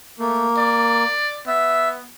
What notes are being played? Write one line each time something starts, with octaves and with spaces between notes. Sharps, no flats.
A3 A#3
D5
B3 E5